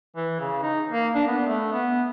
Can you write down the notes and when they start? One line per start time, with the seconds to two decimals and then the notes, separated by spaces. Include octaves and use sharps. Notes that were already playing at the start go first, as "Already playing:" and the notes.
0.16 E3
0.40 C#3
0.62 D#4
0.91 A#3
1.15 D4
1.27 B3
1.47 A3
1.72 B3